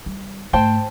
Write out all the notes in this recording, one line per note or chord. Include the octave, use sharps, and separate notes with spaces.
G3
G#2 A3 C5 G5 A5